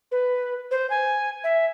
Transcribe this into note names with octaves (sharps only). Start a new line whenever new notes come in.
B4
C5
G#5
E5